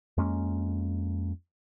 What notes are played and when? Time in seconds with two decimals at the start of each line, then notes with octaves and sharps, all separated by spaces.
0.17 F2 G#3 A#3 C#4